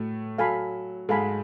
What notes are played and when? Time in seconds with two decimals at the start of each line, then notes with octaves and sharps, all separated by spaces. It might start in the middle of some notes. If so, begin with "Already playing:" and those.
Already playing: A2 A3 F#4
0.38 F#3 A4 F5 G#5 B5
1.09 G#2 G#3 A4 F5 G#5 B5